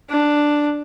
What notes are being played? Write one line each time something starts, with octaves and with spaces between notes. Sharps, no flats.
D4